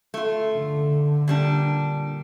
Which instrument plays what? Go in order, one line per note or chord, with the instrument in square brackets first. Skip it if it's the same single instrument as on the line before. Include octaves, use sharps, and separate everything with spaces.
[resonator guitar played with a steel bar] A3 F4
[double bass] D3
[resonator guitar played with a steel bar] A#2 G3 D4